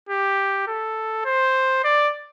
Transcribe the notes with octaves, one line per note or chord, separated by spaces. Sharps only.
G4
A4
C5
D5